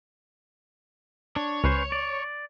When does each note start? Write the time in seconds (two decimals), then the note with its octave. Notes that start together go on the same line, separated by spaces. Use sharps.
1.36 D4 C#5
1.64 C#2 C#4 B4 C5
1.92 D5